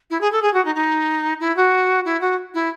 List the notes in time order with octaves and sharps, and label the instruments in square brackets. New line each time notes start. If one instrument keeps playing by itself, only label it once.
[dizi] E4
G#4
A4
G#4
F#4
D#4
D#4
E4
F#4
E4
F#4
E4